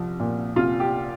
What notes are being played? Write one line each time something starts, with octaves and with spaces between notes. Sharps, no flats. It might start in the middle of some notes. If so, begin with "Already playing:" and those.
Already playing: C2 F3
A#2
C2 F4
G4